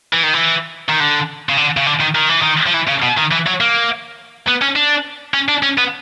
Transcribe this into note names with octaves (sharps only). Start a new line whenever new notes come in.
E3
D#3
E3
D#3
D3
C#3
D3
C#3
D3
D#3
D#3
E3
D#3
F3
E3
C#3
B2
D#3
E3
F#3
A#3
B3
C#4
D4
C#4
D4
C#4
B3